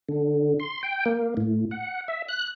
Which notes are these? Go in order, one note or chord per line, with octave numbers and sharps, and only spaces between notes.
D3
C6
G5
A#3
A2
F#5
E5
F#6